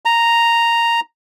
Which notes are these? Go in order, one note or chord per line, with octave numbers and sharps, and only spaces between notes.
A#5